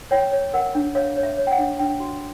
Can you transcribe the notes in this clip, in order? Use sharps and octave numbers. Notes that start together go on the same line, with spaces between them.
C#5 G5
C#5
A#4 F#5
D4
C#5 F5
C#5
E5
C#5
G5
F#5
D4
D4 G5
F#4